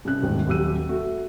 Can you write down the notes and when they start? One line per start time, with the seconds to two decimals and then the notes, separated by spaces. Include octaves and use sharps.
0.05 C2 C#3 F#6
0.22 D#1 C2 G#2 D#3
0.47 D#1 D#2 F#3 G4 E6 D#7
0.89 A3 F#4